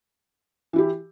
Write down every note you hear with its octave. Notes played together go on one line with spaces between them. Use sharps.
E3 E4 G4